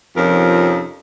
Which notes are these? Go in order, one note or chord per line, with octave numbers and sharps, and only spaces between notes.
F2 C3 F3 C#4 D#4 A#4